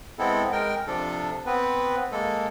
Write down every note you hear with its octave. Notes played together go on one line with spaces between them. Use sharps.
G#3 B3 C4 E4 A4
G#3 A#4 G5
C3 F3 D4 A4
B3 C4 B4
G#3 A#3 A4